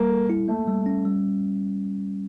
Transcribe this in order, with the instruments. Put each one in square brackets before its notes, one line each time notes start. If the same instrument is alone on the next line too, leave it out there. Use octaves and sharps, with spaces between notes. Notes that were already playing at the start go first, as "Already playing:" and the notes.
Already playing: [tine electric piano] G3 [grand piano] A#3
[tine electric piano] A4
E4
[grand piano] A3 [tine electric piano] A#3
[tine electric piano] G3
C#4
G3